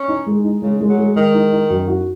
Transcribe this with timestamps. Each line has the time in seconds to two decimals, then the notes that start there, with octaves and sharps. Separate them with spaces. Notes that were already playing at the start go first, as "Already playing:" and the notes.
Already playing: C#4
0.08 D#4
0.26 G#3
0.44 D#4
0.62 C#3 G#3
0.81 G#3
0.89 F#3
0.98 G#3
1.16 D#3 G#3
1.34 D#4
1.52 D#4
1.70 F#2
1.88 F#4